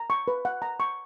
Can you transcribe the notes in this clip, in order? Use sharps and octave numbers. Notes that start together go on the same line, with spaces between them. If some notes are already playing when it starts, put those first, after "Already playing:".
Already playing: A#5
C#6
B4
F#5
A#5
C#6